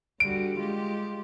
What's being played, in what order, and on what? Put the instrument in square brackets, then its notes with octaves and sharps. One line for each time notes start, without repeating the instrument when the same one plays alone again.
[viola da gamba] D3 G3 F#4 [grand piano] D7
[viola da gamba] G#3 F4 G4